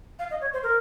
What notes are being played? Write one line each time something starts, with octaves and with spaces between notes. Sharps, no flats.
F5
D#5
C#5
C5
A#4